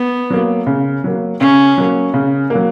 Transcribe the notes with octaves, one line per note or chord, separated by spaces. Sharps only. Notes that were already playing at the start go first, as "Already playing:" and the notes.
Already playing: B3
F#3 A#3
C#3
F#3 A#3
C#3 C#4
F#3 A#3
C#3
A#3
F#3